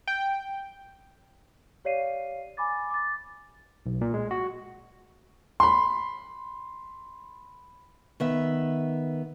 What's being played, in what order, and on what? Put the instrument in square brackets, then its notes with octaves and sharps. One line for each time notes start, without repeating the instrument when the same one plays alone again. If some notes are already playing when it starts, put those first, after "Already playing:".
[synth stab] G5
[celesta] G4 C#5 D5 F5 C7 D#7
G#5 B5 D6 A6
D6 A6
[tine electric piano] B1
A#2
G#3
F#4
[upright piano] B5 C6
[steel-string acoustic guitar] D#3 B3 E5